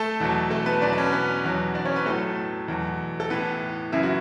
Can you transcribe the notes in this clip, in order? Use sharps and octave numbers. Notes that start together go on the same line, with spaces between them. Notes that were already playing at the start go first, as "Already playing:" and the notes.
Already playing: A3 A4
E2 B2 F#3
A3 A4
B3 B4
E2 B2 F#3 D4 D5
B4
C#4 C#5
B3 B4
E2 B2 F#3
D4 D5
C#4 C#5
B3 B4
A2 F#3 A3 A4
E2 B2 F#3
A4
A2 E3 B3 B4
F#2 C#3 E3 E4
F#4